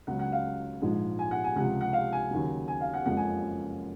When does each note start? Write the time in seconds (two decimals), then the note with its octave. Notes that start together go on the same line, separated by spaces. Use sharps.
0.07 C#2 C#3 F#3 F#5
0.19 F#5
0.32 F5
0.82 A#1 G#2 F3 G#3
1.19 G#5
1.31 F#5
1.44 G#5
1.56 C#2 C3 F3 F#5
1.81 F#5
1.93 F5
2.13 G#5
2.31 D#2 C#3 F#3
2.68 G#5
2.81 F5
2.94 F#5
3.06 F#1 F2 C#3 F3 G#3 F#5
3.17 G#5